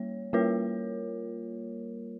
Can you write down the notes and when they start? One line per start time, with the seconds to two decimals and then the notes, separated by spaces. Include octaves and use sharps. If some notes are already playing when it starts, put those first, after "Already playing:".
Already playing: G3 A#3 C#5
0.33 G3 A#3 F4 A#4 C#5